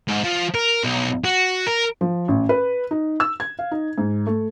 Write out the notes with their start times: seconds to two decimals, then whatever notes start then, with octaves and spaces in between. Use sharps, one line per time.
0.08 G#2
0.24 F3
0.55 A#4
0.84 B1
1.24 F#4
1.67 A#4
2.01 F3
2.28 A1
2.49 B4
2.91 D#4
3.20 E6
3.40 G#6
3.59 F5
3.71 D#4
3.98 G#2
4.27 A3